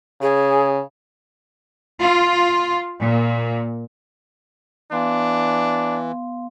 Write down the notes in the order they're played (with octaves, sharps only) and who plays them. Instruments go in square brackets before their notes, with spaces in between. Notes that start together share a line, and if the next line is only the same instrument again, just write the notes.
[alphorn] C#3 [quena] G#4
[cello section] F4
A#2
[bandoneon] E3 [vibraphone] B3 F5 C6 [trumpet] D4